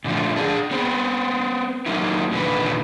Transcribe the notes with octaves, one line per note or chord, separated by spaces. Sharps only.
A#2 D3 F3 A3
D4 G#4
B3 C4
F#3 A#3 D#4 E4
E2 A#2 D3 D#3 B4